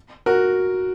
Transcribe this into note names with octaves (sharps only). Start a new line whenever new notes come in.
F#4 A#4